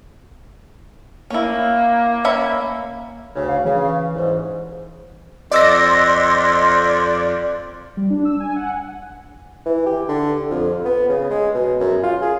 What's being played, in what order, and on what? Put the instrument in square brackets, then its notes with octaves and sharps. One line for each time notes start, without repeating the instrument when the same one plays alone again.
[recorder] A#3 [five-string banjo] C#4 E4
[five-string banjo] C#4 E5 B5
[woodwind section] D2 C#3
[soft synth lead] F5
[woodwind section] C#3 [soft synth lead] E3
[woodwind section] C2 G#2
[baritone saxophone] F2 [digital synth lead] D5 [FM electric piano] D#5 E6 A#6 [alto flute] C6
[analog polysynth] G3
D4
E6
G#5
F#5
[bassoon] E3
G4
D3
F2
B3
C#3
G#3
B2
F#2
F4
G#4